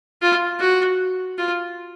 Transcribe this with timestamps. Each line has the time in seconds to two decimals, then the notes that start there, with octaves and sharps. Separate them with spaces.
0.22 F4
0.59 F#4
1.38 F4